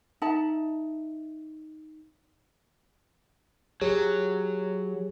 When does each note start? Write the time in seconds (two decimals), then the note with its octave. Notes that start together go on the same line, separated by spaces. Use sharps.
0.22 D#4 E5 A5
3.81 F#3 G4 G#4 C#5